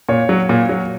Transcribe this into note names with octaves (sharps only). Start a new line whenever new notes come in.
A#2 C#5
F#3
A#2
F#3